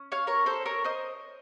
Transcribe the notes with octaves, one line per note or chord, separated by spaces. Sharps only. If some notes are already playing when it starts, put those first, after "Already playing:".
Already playing: C#4
C#5 F5
A#4 C#5
A4 C5
A#4 C#5
C5 D#5